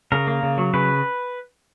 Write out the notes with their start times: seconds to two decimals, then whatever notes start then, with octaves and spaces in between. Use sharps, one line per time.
0.12 C#3 A#4
0.27 A#3
0.43 C#3
0.58 F#3
0.74 C#3 B4